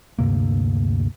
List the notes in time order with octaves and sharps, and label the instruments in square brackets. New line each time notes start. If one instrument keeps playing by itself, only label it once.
[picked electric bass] D2 G2 C3 A#3